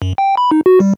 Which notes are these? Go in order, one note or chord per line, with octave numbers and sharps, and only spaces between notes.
F#2
G5
B5
D#4
F#4
G3